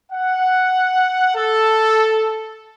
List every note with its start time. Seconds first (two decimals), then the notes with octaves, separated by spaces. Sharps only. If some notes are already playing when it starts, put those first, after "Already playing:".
0.12 F#5
1.35 A4